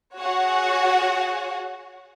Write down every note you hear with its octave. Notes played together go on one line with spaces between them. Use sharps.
F#4 G#4 C#5 F#5